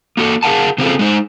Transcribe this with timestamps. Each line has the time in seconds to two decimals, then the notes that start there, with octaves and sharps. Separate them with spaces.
0.17 A#3 F#4 A4
0.43 G#4 A#4 F5 F#5 A5
0.78 C#3 A#3 C4 F4 G#4 A4
0.99 G#3 D#4 C5